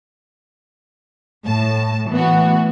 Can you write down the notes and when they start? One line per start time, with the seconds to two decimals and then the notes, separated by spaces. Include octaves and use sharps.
1.46 A2 A5
2.10 E3 A3 B3 F#4